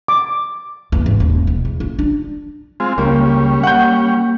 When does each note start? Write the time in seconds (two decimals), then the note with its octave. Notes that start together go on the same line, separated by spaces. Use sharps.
0.08 D6
0.92 E2
1.06 G#1
1.20 D#1
1.47 B2
1.65 E2
1.80 F4
1.99 D4
2.80 G#3 C4 F4
2.98 C#2 C#3 G3 A#3 C#4
3.63 A#3 F#5 G6